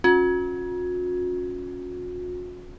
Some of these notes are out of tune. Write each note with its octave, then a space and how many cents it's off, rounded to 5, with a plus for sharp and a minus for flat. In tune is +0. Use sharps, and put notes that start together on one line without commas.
C#4 +0 F#4 -45